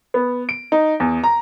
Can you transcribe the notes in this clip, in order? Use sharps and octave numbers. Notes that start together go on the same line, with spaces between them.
B3
D7
D#4
E2
A#5